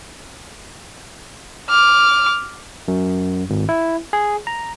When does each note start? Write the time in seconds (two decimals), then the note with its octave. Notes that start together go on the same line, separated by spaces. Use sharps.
1.70 D6 F6
2.88 F#2
3.50 G#1
3.69 E4
4.13 G#4
4.47 A#5